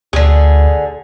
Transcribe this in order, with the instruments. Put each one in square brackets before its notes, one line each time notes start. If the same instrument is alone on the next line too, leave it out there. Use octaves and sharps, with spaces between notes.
[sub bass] D2 [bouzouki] D3 G#4